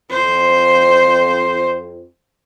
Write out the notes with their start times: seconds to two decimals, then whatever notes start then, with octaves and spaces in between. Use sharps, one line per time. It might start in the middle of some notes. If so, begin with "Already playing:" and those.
0.10 F2 C5